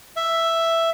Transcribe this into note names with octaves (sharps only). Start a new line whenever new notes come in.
E5